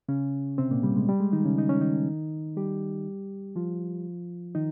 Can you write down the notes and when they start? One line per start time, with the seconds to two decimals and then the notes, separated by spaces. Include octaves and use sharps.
0.09 C#3 C#4
0.58 C3 C4
0.71 A#2 A#3
0.83 G3
0.96 G#3
1.09 G3
1.20 G#3
1.33 D#3 D#4
1.45 C#3 C#4
1.58 D#4
1.69 C#4
1.81 D#3 D#4
2.56 G3 G4
3.56 F3 F4
4.55 D#3 D#4